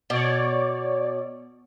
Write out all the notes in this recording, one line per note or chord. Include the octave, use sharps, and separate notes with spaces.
B2 C#5 D5